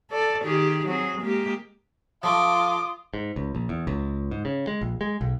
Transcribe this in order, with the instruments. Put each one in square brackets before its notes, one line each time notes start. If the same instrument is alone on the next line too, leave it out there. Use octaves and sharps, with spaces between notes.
[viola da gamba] A4 D5
D#3 G4 G#4
F#3 C4 G#4
G#3 A#3 G4
[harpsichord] F3 A3 [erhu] F4 [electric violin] D6 [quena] D#6
[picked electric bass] G#2
C#2
A#1
E2
C#2
G#2
C#3
G#3
A#1
G#3
B1